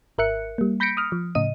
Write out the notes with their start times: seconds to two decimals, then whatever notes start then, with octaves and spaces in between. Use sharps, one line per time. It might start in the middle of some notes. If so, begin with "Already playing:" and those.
0.18 G#1 A#4 E5 F#6 C#7
0.58 G3 A#3
0.80 B5 G6 A#6 B6 C#7 D7
0.97 D#6 F6
1.12 F3
1.35 A2 C#3 D#5 D#7